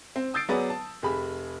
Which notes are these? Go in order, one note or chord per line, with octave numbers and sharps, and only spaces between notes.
C4
D#6 E6 G6 A6 C7 D7
F#3 B3 G#4 B4 D5
A5
F1 G4 G#4 B5